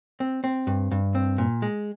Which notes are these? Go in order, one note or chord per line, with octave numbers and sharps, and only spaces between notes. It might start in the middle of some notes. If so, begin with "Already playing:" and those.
C4
C4
G2
G2
C4
A#2
G#3